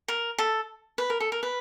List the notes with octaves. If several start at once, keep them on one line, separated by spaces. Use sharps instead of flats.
A#4
A4
B4
A#4
A4
A#4
B4